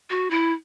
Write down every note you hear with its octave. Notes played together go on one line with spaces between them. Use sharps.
F#4
E4